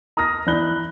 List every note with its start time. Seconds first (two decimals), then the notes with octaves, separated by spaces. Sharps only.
0.17 A#5 D#6 F6 A#6
0.46 E3 D5 B5 F#6 G7